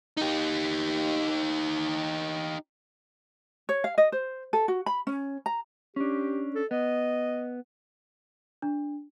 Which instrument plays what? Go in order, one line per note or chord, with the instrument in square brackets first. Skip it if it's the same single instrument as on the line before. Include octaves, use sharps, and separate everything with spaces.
[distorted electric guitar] D#4 G4
[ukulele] C#5
F5
D#5
C5
A4
F#4
B5
C#4
A#5
[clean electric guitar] C#4 D4 [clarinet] G4
[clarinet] A4
[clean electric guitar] B3 [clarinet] D#5
[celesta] D4